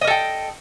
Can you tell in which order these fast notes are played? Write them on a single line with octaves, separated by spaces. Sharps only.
D#5 A#4 A4 G5